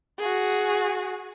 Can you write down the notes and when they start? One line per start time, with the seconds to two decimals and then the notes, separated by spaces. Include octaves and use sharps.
0.19 F#4 G#4